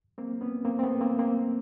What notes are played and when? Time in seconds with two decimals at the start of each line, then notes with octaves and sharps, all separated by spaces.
0.18 A#3 C4
0.41 B3 C#4
0.65 A#3 C4
0.79 C4
0.83 A3 B3
1.01 A#3 C4
1.19 A#3 C4